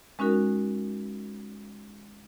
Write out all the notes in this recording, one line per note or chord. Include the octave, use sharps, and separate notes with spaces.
G#3 C#4 D#4 F#4 A#4